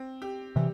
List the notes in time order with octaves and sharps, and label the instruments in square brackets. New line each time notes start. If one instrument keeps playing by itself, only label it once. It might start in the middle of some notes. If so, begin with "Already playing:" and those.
Already playing: [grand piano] C4
G4
[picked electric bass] C3 E3 [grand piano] G3